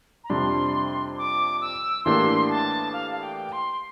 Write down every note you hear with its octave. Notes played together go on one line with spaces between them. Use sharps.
A#5
F2 C3 G3 D4 C6
D6
E6
A2 E3 A#3 D4 G4 C6
A5
F5
F5
G5
C6